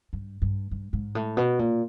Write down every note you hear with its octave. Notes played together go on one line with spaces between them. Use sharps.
G2
G2
G2
G#2
A2
B2
A#2